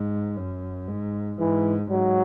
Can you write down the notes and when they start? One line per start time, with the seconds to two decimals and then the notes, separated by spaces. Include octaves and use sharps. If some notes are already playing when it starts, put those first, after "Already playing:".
Already playing: G#2
0.36 F#2
0.88 G#2
1.39 G#2 E3
1.90 G#2 F#3